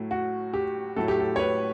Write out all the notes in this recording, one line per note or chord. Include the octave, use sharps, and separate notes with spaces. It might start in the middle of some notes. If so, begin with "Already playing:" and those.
Already playing: A2 F#3 A3
F#4
G4
A2 F#3 A3 A4
G4
A4
C#5
B4